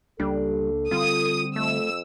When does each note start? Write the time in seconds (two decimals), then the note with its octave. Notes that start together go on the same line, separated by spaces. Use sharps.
0.20 C#2 G3 A#3 D4 A4
0.91 D3 G3 C4 F4 D#6
1.56 F2 A3 E6